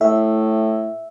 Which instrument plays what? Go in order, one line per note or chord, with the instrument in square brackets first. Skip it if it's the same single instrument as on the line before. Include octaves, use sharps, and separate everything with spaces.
[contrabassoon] A2 [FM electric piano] E5